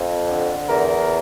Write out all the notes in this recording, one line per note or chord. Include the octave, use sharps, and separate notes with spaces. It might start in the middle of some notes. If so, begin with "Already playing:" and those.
Already playing: F2
D3
E2 A#4